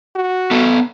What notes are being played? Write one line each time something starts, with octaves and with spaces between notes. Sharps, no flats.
F#4
B3 A4